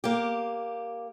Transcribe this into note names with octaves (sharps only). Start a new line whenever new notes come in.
A#3 G4